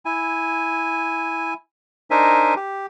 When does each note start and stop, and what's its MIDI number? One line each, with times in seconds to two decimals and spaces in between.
0.05 1.54 64
0.05 1.54 80
2.11 2.54 62
2.11 2.54 63
2.11 2.54 70
2.11 2.54 72
2.11 2.54 76
2.11 2.54 80
2.56 2.86 67